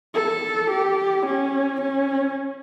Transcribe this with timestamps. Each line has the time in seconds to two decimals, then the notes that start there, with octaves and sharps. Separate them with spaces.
0.15 A4
0.70 G4
1.26 C#4
1.81 C#4